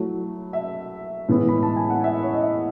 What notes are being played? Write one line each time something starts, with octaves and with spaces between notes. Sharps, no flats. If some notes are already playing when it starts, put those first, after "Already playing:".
Already playing: F#3 A3 E4
E5
A2 E3 G#3 B3 E4
B5
A5
G#5
F#5
E5
C#5
D#5
E5